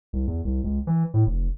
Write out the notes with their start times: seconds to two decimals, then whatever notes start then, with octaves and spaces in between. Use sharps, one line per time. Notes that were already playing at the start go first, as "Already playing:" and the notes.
0.13 C2
0.27 E2
0.45 C2
0.64 C#2
0.87 E3
1.14 A2
1.26 F1